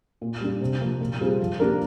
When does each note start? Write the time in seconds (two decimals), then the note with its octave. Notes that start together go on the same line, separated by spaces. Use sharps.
0.21 A#2
0.41 G3 D4
0.61 C3
0.81 F3 A#3
1.01 A#2
1.20 G3 C4 F4 G#4
1.40 F3
1.60 A#3 D4 G4 A#4